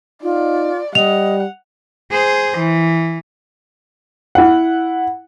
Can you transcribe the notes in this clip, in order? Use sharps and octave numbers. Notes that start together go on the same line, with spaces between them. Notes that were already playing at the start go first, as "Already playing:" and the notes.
D#4 F4 D5
G3 D#5 F#5 F7
G#4 C5
E3
E4 F#5